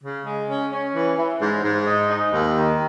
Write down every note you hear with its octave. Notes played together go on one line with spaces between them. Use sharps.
C#3
G#3
C#4
C#4
E3
E3
G#2
G#2
D#4
D#4
D#2
D#3